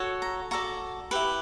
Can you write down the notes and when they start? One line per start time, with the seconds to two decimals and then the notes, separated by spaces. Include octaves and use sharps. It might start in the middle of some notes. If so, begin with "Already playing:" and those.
Already playing: F#4 A4 C#5
0.22 A#5
0.51 F#4 A4 D5 A#5
1.11 E4 G4 B4